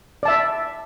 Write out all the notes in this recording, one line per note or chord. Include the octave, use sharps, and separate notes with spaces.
D5 E5 A5